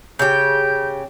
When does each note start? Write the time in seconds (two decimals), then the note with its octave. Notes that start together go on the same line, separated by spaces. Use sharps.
0.19 C#3 G4 G6